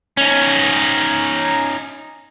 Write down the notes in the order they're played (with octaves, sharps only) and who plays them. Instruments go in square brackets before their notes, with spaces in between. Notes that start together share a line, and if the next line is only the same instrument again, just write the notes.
[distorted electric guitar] C#4 D#4